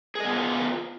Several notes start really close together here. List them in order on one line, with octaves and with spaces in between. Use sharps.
G#4 D#5 B3 F4